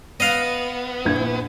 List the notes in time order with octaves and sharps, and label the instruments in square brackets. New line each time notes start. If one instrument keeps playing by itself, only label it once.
[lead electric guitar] B3 [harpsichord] D#5 F5
[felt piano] A#1 E4 G#6